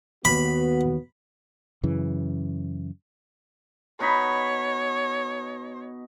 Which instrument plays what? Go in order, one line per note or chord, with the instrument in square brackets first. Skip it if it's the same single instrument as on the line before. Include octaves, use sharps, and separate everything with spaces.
[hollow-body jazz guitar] D#2 [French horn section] B3 F#4 [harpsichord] B5
[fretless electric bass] F#2 C#3 E3
[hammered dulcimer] B2 D#4 B5 [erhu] C#5